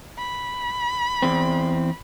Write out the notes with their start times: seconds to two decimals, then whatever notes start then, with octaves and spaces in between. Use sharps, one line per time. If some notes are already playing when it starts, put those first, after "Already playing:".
0.18 B5
1.22 E2 C4